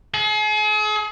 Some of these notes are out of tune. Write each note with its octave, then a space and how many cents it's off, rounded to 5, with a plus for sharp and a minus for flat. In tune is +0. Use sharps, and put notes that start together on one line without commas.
G#4 +40